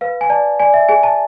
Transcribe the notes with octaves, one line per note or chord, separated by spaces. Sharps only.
B4 F5
G#5
D5 A5
D5 G#5
E5
G#4 G#5
A5